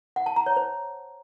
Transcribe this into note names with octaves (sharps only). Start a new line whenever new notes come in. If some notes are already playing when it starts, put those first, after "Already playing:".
F#5
A5
A#5
C#5
C5